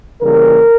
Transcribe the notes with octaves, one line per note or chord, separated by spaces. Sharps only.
C#3 E3 G3 A#3 A#4